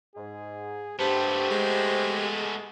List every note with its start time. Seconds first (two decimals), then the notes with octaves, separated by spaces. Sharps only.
0.16 G#2 G#4
0.99 G2 A3 B3 G4 C5
1.51 G#3